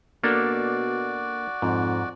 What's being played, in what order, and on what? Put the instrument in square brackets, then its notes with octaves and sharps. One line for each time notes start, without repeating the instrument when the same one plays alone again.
[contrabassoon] B2 [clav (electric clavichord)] A#3 D4 A4 [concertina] F#4 D5
[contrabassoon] F2 [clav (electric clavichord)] G#2